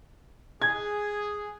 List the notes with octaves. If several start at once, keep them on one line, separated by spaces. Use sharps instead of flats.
G#4 G#6